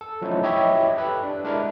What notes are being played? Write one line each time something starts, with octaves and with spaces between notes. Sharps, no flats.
A4
F3 F#3 A3 C#4 D#4 E4
E4 G4 C#5 D#5 E5
G4 A4 B4
D4
G#3 D4 E4 A#4